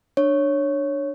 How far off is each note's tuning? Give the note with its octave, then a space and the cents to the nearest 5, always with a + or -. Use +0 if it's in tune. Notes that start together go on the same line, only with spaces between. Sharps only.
D4 +10 C#5 +0